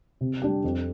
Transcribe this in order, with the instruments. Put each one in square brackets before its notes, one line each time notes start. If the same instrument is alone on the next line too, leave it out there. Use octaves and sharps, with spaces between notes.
[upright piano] C3
G3 D4 G4
F2